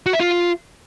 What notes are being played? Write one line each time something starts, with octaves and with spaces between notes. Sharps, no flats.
F#4
E5
F4